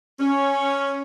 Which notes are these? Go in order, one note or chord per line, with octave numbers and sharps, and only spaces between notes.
C#4